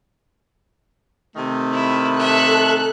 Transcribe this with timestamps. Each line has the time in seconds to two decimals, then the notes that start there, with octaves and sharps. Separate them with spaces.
1.36 C3 D#3 A3
1.73 E4
2.19 A4 E5 F#6